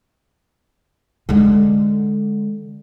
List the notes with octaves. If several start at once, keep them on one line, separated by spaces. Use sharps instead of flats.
D3 G#3